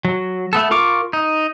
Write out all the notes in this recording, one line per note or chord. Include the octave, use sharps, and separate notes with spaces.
F#3
A3 B3 A4
F4 A#4 C#6 D6
D#4